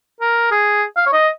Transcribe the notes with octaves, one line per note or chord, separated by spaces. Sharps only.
A#4
G#4
F5
C#5
D#5